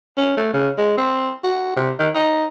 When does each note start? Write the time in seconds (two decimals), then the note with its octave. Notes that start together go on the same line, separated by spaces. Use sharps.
0.17 C#4
0.37 A3
0.54 C#3
0.78 G#3
0.97 C4
1.44 F#4
1.76 C3
1.99 D#3
2.15 D#4